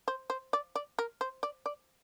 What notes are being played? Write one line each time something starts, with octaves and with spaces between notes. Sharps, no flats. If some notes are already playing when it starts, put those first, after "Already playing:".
C5
C5
D5
D5
A#4
C5
D5
D5